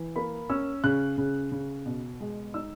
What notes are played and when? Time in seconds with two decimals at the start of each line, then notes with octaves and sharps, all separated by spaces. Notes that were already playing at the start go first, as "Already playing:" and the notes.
Already playing: E3
0.16 A#3 B5
0.50 C#4 E6
0.84 C#3 F#6
1.18 C#3
1.52 C#3
1.86 B2
2.20 G#3
2.54 D#4 E6